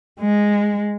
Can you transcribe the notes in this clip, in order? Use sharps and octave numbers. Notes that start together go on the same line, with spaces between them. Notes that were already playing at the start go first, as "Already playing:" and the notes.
G#3